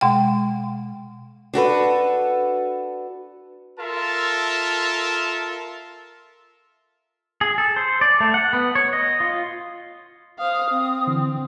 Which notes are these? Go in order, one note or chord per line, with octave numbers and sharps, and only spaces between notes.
B2 G#3 F#5 G5
D4 F#4 A4 B4
F4 A4 A#4 E5 A5
G#4
A4
C5
D5
A3
F#5
B3
C#5
D#5
F4
C5 F5 D#6
C4
D3 E3